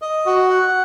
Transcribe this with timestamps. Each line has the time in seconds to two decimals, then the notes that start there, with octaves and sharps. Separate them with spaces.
0.02 D#5
0.26 F#4
0.50 F#5